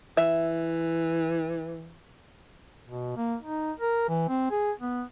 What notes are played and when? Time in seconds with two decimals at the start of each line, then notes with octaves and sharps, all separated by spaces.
0.17 E3 E5
2.87 B2
3.16 A#3
3.42 D#4
3.79 A#4
4.09 E3
4.29 C4
4.51 G#4
4.80 B3